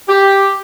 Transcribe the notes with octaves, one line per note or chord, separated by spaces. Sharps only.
G4